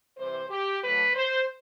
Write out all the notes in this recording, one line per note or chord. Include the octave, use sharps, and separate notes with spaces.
C3 E3 G3 C5
G4
D3 F#3 A3 B4
C5